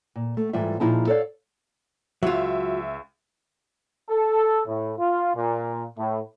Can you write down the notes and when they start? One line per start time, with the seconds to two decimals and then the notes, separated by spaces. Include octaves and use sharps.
0.16 A#2
0.37 A3
0.53 G#2 E3 G3 F4 E5
0.80 A#2 F3 D#4 E4 G#4 A5
1.07 A4 C#5 D5 F5
2.23 C#2 F#3 F4 E5
4.09 A4
4.67 A2
4.98 F4
5.35 A#2
5.98 A2